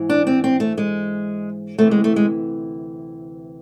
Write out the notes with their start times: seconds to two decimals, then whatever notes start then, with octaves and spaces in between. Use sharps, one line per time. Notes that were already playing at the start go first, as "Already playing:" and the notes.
Already playing: G#2 E3
0.09 D4
0.27 C4
0.44 C4
0.60 A3
0.78 G#3
1.78 D2 C3 E3 A3
1.91 G#3
2.04 A3
2.16 G#3